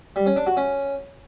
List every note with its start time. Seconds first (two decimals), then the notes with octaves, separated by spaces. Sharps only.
0.16 G3
0.26 C#4
0.36 D4
0.47 F#4
0.57 C#4